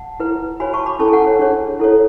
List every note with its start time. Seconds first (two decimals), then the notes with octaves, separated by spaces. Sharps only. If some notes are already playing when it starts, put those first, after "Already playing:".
Already playing: F#5 A5
0.20 E4 B4
0.60 F#4 C#5 G#5 B5
0.73 A5 C#6
0.86 B5 D6
0.99 C#4 E4 A4 A5 C#6
1.08 G#5
1.13 F#5 A5
1.27 C#5
1.39 D4 G#4 C#5
1.80 E4 A4 C#5